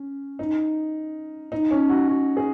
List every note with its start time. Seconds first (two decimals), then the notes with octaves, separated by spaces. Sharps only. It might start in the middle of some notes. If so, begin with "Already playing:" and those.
Already playing: C#4
0.39 D#4
1.52 D#4
1.71 C#4
1.89 F#4
2.08 F#4
2.37 G#4